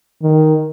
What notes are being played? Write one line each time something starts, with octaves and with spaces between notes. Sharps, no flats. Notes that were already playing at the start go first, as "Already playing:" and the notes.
D#3